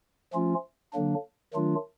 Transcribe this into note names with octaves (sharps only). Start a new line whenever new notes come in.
F3 A3 C#4 F4
D3 F#3 A#3 D4
D#3 F#3 A3 D4 F4